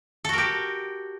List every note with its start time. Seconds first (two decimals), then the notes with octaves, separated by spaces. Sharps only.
0.25 A4
0.29 F#4
0.33 A#4
0.38 G4